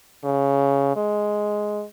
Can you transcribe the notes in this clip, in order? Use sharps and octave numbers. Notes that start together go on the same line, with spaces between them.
C#3
G#3